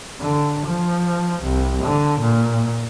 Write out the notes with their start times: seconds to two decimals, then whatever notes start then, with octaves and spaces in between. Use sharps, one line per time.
0.20 D3
0.66 F3
1.43 C2
1.83 D3
2.20 A#2